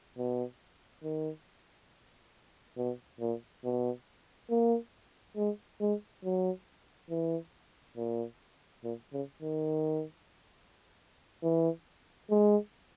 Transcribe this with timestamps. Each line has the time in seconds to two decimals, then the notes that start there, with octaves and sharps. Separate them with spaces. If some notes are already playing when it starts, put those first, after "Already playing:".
0.18 B2
1.03 D#3
2.77 B2
3.20 A#2
3.64 B2
4.50 A#3
5.37 G#3
5.81 G#3
6.24 F#3
7.10 E3
7.97 A#2
8.84 A#2
9.13 C#3
9.42 D#3
11.43 E3
12.31 G#3